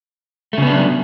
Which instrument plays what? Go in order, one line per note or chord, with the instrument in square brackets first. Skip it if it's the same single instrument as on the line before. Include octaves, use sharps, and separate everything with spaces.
[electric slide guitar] A3
C#3
B3
D4
F#3